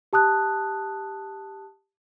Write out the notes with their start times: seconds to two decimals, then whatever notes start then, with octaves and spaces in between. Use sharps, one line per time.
0.13 G4 A5 D#6 F#6